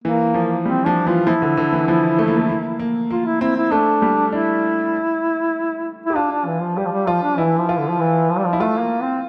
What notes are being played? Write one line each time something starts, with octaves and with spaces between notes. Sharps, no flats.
E3 A#3
F3
G3 C4
F3 D4
E3 F4
F3 E4
D3
D3
E3
F3
A3
A#3
A3
A#3
A#3
A#3 F4
E4
C4 E4
E4
A3 D4
G3
D4 E4
E4 G4
D4 F4
D4
E3
F3
G3 G4
F3
G3
F3 F4
D4
E3 E4
F3
F4
D3
F3
E3
F3
G3
F3
E4
A3 F4
A#3
C4